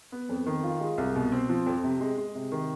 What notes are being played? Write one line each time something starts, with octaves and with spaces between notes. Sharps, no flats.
B3
F2
D#3
F4
G#3
C2
B2
C4
F3
F2
C3
G#3
G#3
C3
D#3